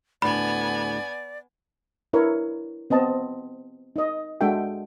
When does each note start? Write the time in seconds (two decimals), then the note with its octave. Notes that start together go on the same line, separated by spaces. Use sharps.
0.22 D2 A2 B3 D5 G#5 B5
2.13 D4 E4 A#4 B4 C#5
2.90 B3 C4 D#5 A5
3.96 D#4 D#5
4.41 G#3 D4 F#4 A4 E5 G5